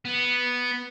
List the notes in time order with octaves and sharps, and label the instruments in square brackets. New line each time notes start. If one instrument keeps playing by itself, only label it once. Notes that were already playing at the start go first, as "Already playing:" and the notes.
[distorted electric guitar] B3